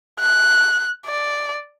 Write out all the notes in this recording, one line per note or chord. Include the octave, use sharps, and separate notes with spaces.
F#6
D5